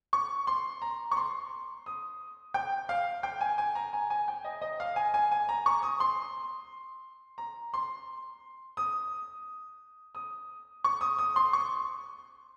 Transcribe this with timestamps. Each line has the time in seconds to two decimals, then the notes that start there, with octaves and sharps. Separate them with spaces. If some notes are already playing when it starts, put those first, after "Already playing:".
0.13 C#6
0.47 C6
0.82 A#5
1.11 C#6
1.17 C6
1.86 D#6
2.54 G5
2.89 F5
3.23 G5
3.41 G#5
3.58 G#5
3.75 A#5
3.93 G#5
4.10 G#5
4.28 G5
4.44 D#5
4.61 D#5
4.80 F5
4.96 G#5
5.14 G#5
5.31 G#5
5.49 A#5
5.66 C#6
5.83 D#6
6.00 C6
7.38 A#5
7.74 C6
8.77 D#6
10.15 D#6
10.84 C#6
11.01 D#6
11.19 D#6
11.36 C6
11.53 C#6